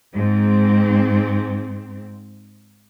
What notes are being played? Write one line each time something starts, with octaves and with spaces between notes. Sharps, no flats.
G#2 C4